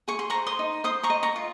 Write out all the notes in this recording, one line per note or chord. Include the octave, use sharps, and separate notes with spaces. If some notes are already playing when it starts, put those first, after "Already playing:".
G#4 C#6
C6
A#5 C#6
C5
C6 D#6
D#4
C5 C6 D#6
A#5 C#6
D#5
A#5 C#6
F4